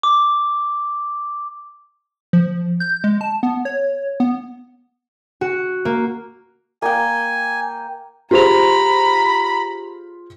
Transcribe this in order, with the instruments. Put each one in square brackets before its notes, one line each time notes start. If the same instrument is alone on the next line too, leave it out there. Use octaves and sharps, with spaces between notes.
[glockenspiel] D6
[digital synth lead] F3
G6
G#3
A5
B3
C#5
B3
[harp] F#4
A#3
[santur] A#3 G5 [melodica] G#5
[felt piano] F4 G#4 C5 [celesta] G4 F7 [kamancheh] A#5 B5